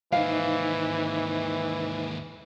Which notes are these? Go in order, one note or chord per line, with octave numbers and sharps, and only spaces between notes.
D#2 G#2 E3 D#4 C5 D#5 F5